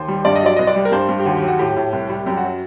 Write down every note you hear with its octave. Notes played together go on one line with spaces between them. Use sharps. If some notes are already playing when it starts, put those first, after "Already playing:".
Already playing: D#2 C5
G3
G2 D5
D#5
F#3 D5
C2 D#5
D5
G3
A#4
G2 C5
G2
G4
D#2 F#4
G4
F#3 F#4
A2 G4
A2
C2
G3
F#2 G4
F#4
F#3